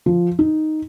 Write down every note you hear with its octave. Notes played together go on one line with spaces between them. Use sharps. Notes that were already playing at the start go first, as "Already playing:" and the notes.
F3
D#4